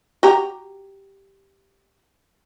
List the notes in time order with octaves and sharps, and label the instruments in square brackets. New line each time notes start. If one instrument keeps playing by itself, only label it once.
[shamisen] F#4 G4 A#5